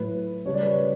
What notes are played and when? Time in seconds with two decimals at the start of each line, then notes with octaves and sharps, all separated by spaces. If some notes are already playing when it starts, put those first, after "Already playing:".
Already playing: A2 F#3 A3 B4
0.46 C#3 G3 C#5
0.54 D5
0.62 B4
0.71 C#5